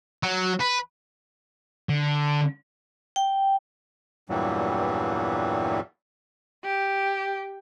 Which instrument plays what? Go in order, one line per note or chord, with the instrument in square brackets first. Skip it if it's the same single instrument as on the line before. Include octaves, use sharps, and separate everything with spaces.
[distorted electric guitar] F#3
B4
D3
[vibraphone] G5
[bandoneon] E2 G2 A#2 E3 F#3 G3
[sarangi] G4